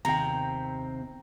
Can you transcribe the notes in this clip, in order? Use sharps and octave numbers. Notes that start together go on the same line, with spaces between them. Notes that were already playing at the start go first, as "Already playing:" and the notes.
D#2 C3 C4 G5 A#5